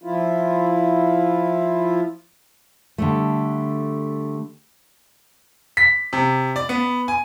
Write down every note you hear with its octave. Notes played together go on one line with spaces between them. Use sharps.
F3 E4 F4
D3 G3 A3
B6
C3
D5
B3
G#5